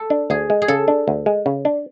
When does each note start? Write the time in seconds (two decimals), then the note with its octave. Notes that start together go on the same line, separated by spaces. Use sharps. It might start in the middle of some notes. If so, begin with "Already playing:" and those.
Already playing: A4
0.10 D4
0.30 D2 G#4
0.50 G#3
0.62 G#4
0.68 C#3 A4
0.88 D4
1.08 D2
1.26 G#3
1.46 C#3
1.65 D4